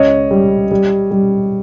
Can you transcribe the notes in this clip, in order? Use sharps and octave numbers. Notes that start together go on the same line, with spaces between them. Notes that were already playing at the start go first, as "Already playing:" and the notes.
Already playing: C#2 C#5 D#5
G3
G3
G3